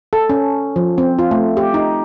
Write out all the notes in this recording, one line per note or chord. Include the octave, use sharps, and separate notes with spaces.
A4
C#4
F3
C4
F4
A3
G4
D#4